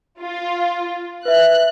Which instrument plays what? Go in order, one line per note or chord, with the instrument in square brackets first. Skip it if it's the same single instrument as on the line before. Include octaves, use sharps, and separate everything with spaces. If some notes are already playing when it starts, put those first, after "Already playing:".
[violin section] F4
[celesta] B4 E5 [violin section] F#6